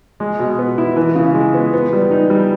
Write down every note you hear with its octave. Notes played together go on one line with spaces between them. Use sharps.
G#3
B2
B3
E4
E3
C#3
G#3
B3
B3
G3
D#4
G3